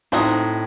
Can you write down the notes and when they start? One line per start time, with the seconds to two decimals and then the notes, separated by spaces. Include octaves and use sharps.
0.12 A2 C4 D#4 F#4